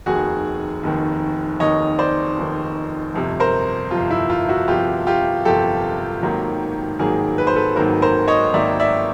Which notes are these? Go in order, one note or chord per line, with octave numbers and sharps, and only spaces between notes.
F1 D#2 D#3 F#4 G#4
F1 D#2 D#3
F1 D#2 D#3 C#5 D#5
C5 D5
F1 D#2 D#3
G1 F2 C3
A#4 C5
G1 F2 C3 F4
E4
F4
E4 F#4
G1 F2 C3 F4 G4
F4 G4
G1 F2 C3 G4 A4
G#1 G#2 D#3 F#3 A#3
G#1 G#2 D#3 F#3 A#3 G#4 A#4
B4
C5
A4 B4
G#1 G#2 D#3 F#3 A#3 A#4 C5
A#4 C5
C#5 D#5
G#1 G#2 D#3 F#3 A#3 D5 E5
D5 E5